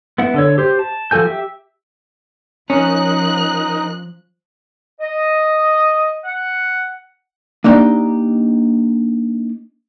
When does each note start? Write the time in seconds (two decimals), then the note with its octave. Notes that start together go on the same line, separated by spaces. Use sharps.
0.18 B3 E4 F#5
0.34 D3 A4 C#5
0.58 G4 C5
0.79 A5
1.11 F3 F#4 A4 G#5 G6
1.25 G4 E5
2.70 F3 C#4 D#4 A#4 F#6
5.01 D#5
6.25 F#5
7.64 A#3 D4 D#4 G4